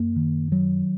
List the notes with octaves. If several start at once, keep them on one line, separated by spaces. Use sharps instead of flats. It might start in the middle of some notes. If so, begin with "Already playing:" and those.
Already playing: F#2 A#3
D#3
F#3